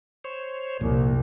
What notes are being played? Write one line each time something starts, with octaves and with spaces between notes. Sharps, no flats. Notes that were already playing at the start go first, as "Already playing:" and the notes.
C5 C#5
C2 F2 A#2